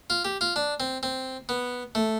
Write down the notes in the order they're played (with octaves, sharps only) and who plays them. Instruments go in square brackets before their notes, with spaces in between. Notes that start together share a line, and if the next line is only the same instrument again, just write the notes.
[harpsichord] F4
G4
F4
D4
C4
C4
B3
A3